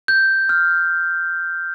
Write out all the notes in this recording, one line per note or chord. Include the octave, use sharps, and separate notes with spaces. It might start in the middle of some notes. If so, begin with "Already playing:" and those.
G6
F6